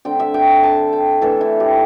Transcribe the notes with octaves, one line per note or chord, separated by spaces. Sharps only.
D3 A3 C4 G5
E5
G5
A5
G5
E3 A3 D4 A4
E4
G4